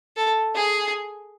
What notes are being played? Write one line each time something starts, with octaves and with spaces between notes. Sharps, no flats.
A4
G#4